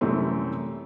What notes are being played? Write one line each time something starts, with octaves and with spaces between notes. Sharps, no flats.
F#2 C3 E3 G3 A3 C4